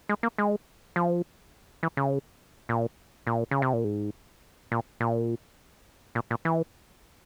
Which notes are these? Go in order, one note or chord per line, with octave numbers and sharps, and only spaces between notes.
G#3
A#3
G#3
F3
E3
C#3
A#2
A#2
C#3
C3
A#2
G#2
A#2
A#2
A#2
A#2
E3